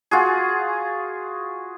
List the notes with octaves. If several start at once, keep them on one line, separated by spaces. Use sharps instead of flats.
F4 F#4 G#4